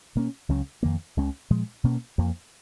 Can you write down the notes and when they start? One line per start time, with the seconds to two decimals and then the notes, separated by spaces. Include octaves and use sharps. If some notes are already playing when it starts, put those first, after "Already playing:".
0.15 B2 A#3 C#4
0.49 C#2 C#3 F#3 C#4
0.83 F2 D#3 A#3
1.17 C#2 C#3 G#3 C#4
1.50 A#2 F3 G#3
1.84 B2 A#3 C#4
2.18 F2 F3 A#3